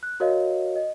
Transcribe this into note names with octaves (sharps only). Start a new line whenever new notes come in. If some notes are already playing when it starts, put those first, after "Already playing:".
F#6
F#4 A#4 C#5 D#5 F5
D#5